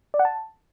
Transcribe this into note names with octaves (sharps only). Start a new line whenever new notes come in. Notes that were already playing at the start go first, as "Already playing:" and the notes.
D5
F#5
A5